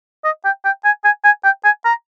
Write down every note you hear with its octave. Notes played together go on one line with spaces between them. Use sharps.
D#5
G5
G5
G#5
G#5
G#5
G5
G#5
A#5